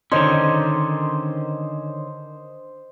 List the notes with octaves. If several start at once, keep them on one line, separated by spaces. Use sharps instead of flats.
D3 D#3 C#4 C5 D#5